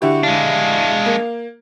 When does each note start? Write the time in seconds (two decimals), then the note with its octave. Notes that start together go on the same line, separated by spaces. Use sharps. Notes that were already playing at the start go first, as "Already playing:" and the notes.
0.02 D3 E4 F#4 G4
0.23 G#3 D4 F5
1.06 A#3